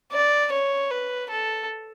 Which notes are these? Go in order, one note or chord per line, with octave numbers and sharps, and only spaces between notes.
D5
C#5
B4
A4